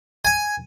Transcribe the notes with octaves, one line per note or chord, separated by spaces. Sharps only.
G#5